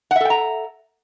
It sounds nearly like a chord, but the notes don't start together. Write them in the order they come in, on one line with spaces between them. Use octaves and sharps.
F#5 E5 A4 G5 A#5